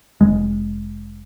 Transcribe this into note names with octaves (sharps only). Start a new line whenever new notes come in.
F1 G#3